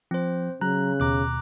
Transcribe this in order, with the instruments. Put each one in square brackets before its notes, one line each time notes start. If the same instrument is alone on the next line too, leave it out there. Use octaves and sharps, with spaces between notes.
[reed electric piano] F3 [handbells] C4 C5
[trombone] C#3 [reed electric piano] F#3 A#5 [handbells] F#6
[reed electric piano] D#2 B2 [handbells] A#5 D6 F#6